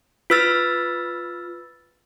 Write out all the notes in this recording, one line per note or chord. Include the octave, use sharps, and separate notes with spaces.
F4 B4 E6 F6 A6